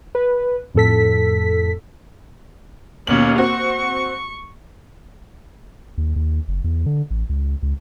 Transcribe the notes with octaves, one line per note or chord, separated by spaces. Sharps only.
B4
F2 A2 A4 B6
D#2 B2 A#3 C#4 F#7
C4 F#4 C#6
D#2
D#2
F#1
E2
D3
A1
C#2
C#2